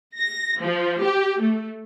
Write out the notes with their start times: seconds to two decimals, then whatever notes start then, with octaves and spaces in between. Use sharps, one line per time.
0.18 A#6
0.60 F3
1.02 G4
1.41 A3